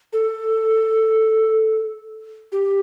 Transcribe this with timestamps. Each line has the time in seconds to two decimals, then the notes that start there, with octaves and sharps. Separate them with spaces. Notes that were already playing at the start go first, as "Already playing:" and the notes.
0.13 A4
2.52 G4